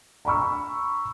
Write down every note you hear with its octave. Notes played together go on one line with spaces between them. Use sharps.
A#5 B5 C#6 E6